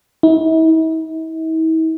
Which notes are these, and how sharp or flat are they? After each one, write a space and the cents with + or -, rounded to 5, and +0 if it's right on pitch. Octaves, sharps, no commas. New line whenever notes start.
E4 -45